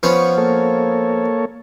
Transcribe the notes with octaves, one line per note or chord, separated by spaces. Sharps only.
F3 B3 C#4 C#6
A#3 A4 C#5